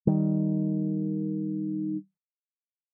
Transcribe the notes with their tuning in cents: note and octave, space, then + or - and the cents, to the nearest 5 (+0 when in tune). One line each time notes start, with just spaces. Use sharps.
D#3 +0 G3 +0